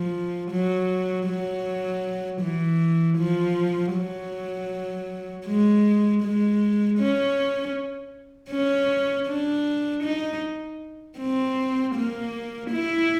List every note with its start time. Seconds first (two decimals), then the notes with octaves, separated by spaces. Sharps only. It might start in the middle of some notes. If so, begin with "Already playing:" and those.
Already playing: F3
0.51 F#3
1.27 F#3
2.42 E3
3.18 F3
3.94 F#3
5.46 G#3
6.23 G#3
6.99 C#4
8.51 C#4
9.27 D4
10.03 D#4
11.19 C4
11.95 A#3
12.70 E4